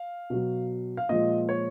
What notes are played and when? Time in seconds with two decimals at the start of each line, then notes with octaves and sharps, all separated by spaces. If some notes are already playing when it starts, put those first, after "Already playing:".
Already playing: F5
0.30 B2 F#3
0.97 F5
1.09 A#2 F3 G#3 D#5
1.49 C#5